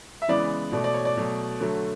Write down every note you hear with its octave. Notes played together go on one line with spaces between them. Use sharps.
E5
C#3 E3 G#3 B3 D5
B2 A3 D5
D5
C#5
D5
B2 F#3 A3
D3 F#3 A3